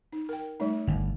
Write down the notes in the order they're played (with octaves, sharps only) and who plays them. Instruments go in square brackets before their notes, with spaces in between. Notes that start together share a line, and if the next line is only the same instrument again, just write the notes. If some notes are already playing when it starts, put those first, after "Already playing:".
[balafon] D#4
A#4 G5
G3 A3 D#4
[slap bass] G1